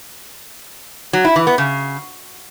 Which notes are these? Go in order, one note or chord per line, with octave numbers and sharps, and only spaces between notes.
F#3
E4
E3
B3
C#3